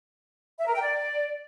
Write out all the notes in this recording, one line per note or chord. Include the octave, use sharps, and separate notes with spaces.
E5
A#4
G5
D5